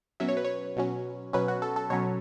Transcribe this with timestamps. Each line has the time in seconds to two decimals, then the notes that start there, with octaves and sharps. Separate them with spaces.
0.20 B2 F#3 C#4 E5
0.28 C#5
0.37 B4
0.45 C#5
0.76 B2 F#3 C#4
1.33 B2 F#3 C#4 B4
1.48 F#4
1.62 A4
1.76 A4
1.90 B2 F#3 C#4 C#5